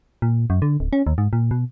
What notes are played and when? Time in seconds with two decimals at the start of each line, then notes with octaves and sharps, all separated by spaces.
0.22 A#2
0.50 F#2
0.62 D3
0.80 D1
0.93 C#4
1.07 D#2
1.18 G#2
1.33 A#2
1.51 B2